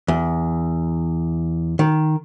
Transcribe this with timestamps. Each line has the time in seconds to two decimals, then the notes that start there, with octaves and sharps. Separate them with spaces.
0.08 E2
1.79 D#3